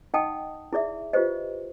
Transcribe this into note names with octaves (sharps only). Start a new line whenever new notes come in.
D#4 D#5 F#5 G5 A5 D#6
E4 G#4 D5 E5
F4 G4 B4 C5 D#5